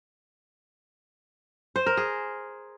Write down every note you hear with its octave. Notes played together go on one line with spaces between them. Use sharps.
C5
A#4
G#4